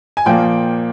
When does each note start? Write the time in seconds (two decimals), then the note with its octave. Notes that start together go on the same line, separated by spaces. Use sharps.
0.17 G#5
0.26 A#2 F3 A#3 G5